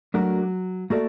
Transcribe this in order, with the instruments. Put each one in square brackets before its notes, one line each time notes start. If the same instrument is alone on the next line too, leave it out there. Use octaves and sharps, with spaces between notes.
[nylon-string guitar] F#3 [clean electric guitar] A3 D4 F#4 A#4
[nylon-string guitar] A3 [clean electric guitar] A#3 F#4 A4 D5